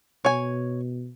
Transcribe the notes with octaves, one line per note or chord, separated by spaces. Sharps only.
B2 C#5 G#5